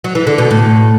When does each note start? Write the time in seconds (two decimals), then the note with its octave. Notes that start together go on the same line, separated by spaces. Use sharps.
0.04 F#3
0.15 E3
0.27 D3
0.38 B2
0.51 A2